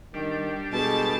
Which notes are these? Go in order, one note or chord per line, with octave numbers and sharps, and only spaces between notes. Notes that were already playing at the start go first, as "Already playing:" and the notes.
D#3 G3 D4
B2 G#3 A4 A5 A6